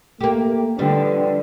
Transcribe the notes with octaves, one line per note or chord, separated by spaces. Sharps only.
A3 A#3 G4
D3 F3 G3 B4